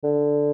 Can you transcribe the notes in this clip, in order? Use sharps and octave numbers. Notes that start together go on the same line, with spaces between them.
D3